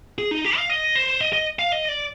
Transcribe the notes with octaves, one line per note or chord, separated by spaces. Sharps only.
G#4
D#4
G4
F5
D#5
C5
D#5
D#5
F5
D#5
D5